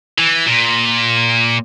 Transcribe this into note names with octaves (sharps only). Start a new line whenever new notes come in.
E3
A#2